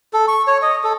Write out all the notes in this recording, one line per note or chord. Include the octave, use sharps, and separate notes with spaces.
A4
C#6
C#5
D#5
A4